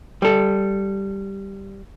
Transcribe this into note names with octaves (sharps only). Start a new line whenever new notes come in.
G3 A4